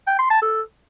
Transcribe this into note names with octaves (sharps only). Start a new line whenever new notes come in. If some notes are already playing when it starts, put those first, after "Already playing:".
G5
C6
A5
A4